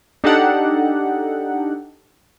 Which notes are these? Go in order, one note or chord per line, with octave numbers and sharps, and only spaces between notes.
D4 D#4 G4 A4 F#5